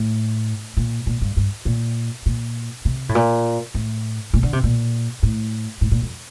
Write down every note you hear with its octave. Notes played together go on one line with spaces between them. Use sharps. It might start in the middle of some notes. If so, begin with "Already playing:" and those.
Already playing: A2
A#2
A#2
G2
G2
A#2
A#2
C3
A2
A#2
A2
A#2
D3
C3
A#2
A2
A2
A#2
F2